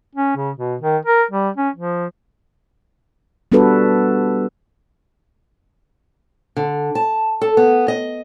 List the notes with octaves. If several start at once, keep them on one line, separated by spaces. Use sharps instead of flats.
C#4
C#3
B2
D#3
A#4
G3
C#4
F3
G3 B3 D4 F#4 A4 B4
D3
A5
A4
B3
D#5